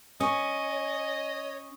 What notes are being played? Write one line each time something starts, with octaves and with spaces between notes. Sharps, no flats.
C#4 C#5 D#5 C#6 D#6